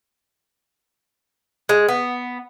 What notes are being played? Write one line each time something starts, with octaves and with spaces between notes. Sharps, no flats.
G#3
B3